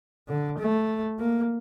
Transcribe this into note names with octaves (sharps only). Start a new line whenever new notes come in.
D3
A3
A#3